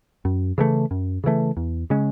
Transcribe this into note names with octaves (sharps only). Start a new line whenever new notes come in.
F#2
C#3 E3 A3
F#2
C#3 E3 A3
E2
C#3 G#3 C#4